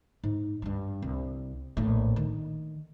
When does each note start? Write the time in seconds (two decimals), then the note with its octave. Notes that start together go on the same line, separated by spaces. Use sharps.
0.24 G#2
0.62 G2 G3
1.02 C2
1.77 A#1 A2
2.16 D#3